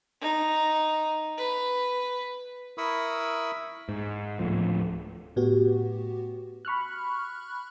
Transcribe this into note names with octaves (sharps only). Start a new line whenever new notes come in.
D#4
B4
E4 A#4 B5 C#6 D#6 E6
G#2
D1 A2 F3
A2 B3 F#4 G4
B5 C#6 F6 F#6